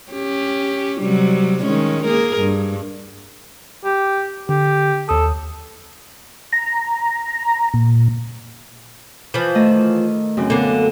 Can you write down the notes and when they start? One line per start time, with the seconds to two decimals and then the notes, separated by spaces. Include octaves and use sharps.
0.12 C#4 G4
1.01 C3 F#3 G3
1.63 D#3 G#3 C#4
2.05 A#3 G#4 A#4
2.39 G2
3.85 G4
4.49 D3 G4
5.09 D#2 A4 D#6
6.53 A#5
7.74 A#2
9.34 E3 F3
9.55 D#3 A3 D#5
10.37 F#2 C#3 C4
10.50 D3 A#3 B3